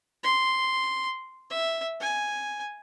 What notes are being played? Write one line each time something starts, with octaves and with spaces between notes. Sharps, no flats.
C6
E5
G#5